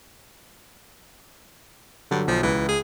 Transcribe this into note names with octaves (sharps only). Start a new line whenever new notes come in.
G2 D3 F#3
B1 F3
C#2 E3
G#4